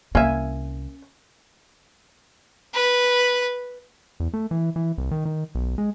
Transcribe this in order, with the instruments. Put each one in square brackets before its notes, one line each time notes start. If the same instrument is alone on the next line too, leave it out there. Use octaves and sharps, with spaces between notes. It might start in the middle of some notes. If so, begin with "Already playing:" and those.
[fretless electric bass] C2 [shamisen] A#3 E5 [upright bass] C#4 [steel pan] G#5
[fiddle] B4
[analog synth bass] E2
A3
E3
E3
C2
D#3
D#3
B1
G#3